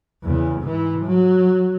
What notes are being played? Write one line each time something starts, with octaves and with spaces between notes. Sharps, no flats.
E2 C#3
G#2 E3
F#3